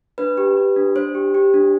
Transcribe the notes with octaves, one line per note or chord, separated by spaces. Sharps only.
D4 B4
G4
G4
D4
D4 C5
G4
G4
D4